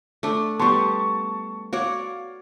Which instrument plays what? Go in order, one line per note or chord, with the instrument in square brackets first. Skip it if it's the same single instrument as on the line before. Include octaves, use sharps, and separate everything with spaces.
[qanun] A3 D4
[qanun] G3 B3 [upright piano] A5 C6 C#6
[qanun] F#4 C#5 D5 [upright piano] F5